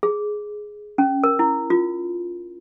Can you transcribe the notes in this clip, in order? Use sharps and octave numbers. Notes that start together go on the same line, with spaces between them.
G#4
C#4
A#4
E4
F4